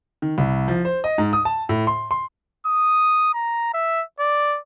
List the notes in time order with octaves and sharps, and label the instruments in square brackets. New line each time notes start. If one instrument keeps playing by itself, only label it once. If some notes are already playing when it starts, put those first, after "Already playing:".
[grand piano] D#3
C2
F3
C5
D#5
G#2
D#6
A5
A2
C6
C6
[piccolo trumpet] D#6
A#5
E5
D5